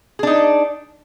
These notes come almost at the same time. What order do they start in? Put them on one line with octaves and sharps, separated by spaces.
G#4 D4 D#4